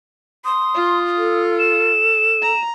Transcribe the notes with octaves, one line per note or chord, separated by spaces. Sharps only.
C6 D#6
F4
A4
E7
A#5